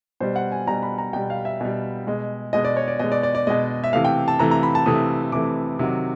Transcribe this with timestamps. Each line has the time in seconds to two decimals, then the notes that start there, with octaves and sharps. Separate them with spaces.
0.20 B2 G3 C5
0.36 F#5
0.52 G#5
0.67 B2 G3 A#5
0.83 B5
0.98 A#5
1.13 B2 G3 G5
1.30 F5
1.45 E5
1.61 B2 G3
2.07 B2 G#3
2.53 B2 G#3 D#5
2.65 D5
2.77 C#5
2.88 D5
2.99 B2 G#3 D#5
3.12 D5
3.23 D5
3.35 D5
3.47 B2 G#3 D#5
3.84 E5
3.93 C3 E3 A3 F5
4.05 G5
4.28 A5
4.39 C3 E3 A3 A#5
4.51 A#5
4.63 B5
4.75 A5
4.86 C3 E3 A3 D#6
5.32 C3 E3 A3 D6
5.79 C3 D#3 F#3